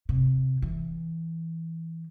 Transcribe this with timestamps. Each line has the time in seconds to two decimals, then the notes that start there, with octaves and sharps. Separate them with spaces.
0.09 C3
0.62 E3